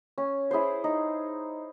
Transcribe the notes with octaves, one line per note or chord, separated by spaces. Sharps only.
C#4
E4 G#4 C5
D#4